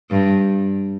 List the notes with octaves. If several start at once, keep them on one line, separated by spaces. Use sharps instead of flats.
G2